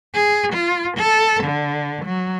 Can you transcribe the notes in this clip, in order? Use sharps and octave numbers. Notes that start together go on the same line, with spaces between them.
G#4
F4
A4
D3
F#3